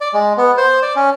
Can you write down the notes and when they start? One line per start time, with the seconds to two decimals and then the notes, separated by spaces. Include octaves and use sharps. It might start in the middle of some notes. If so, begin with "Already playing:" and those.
0.01 D5
0.13 G#3
0.37 B3
0.57 C5
0.82 D5
0.96 C#4